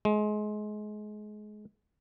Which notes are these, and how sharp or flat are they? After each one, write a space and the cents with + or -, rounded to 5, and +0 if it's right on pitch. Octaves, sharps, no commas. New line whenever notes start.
G#3 +25